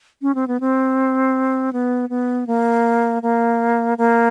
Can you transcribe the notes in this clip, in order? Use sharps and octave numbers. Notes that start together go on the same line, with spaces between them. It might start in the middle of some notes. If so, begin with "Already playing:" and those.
C#4
C4
B3
C4
B3
B3
A#3
A#3
A#3